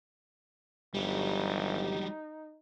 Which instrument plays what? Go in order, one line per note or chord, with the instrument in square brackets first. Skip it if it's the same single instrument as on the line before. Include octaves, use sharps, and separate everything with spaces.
[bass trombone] G1 [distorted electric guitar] F#3 G3 [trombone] D#4 [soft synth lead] G4